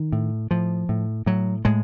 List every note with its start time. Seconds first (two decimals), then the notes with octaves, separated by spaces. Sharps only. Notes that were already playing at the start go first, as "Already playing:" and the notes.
Already playing: D#3
0.12 A2
0.51 A2 F3
0.89 A2
1.26 A2 F#3
1.65 A2 G#3